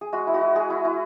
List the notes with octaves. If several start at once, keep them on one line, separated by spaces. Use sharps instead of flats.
G#4
G#3 F#4
E4
F#4
E4
G#3 G#4
E4
E4